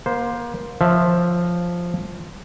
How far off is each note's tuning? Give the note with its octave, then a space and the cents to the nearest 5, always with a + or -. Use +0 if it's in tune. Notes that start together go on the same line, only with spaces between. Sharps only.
A#3 +30 C5 +0
F3 +0 C#5 -10 E5 +5